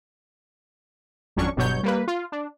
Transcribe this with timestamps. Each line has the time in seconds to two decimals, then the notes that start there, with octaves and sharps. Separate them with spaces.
1.36 G#1 F2 F#3 C#4 D4 C#6
1.56 G1 G2 B2 F#3 C#5 G6
1.83 G3 A#3 B4
2.08 F4
2.32 D4